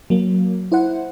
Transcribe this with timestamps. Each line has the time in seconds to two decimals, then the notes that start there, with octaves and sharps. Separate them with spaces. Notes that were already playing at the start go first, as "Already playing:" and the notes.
0.10 F#3 A#3
0.72 E4 C5 F#5